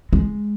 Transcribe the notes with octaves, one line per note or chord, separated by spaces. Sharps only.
G#3